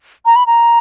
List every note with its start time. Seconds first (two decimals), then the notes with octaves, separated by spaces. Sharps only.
0.26 A#5
0.36 B5
0.47 A#5